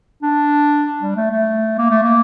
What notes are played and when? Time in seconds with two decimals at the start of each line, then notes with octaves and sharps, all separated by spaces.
0.23 D4
1.01 G3
1.16 A3
1.31 A3
1.78 A#3
1.91 A3
2.03 A#3